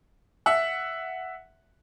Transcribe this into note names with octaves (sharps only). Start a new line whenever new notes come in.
E5 F#5